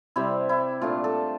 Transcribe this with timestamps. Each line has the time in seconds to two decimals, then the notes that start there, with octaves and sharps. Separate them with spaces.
0.16 C3 G3 C4 E4
0.49 E4
0.81 A#2 A3 D4 F4
1.04 A4